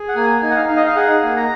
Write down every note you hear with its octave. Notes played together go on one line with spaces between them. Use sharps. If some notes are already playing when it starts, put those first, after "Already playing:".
Already playing: G#4
F#5
A#3 G#5
D#4
F#5
F5
D#4
D#5
F5
G#4 F#5
A#3
A#5